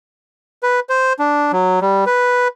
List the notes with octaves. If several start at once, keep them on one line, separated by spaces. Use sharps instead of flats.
B4
C5
D4
F#3
G3
B4